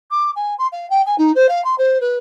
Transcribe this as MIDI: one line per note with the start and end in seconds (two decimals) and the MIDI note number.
0.11 0.31 86
0.36 0.54 80
0.58 0.67 84
0.72 0.89 77
0.90 1.02 79
1.06 1.15 80
1.18 1.32 63
1.35 1.47 72
1.49 1.62 77
1.64 1.75 84
1.78 1.98 72
2.01 2.18 71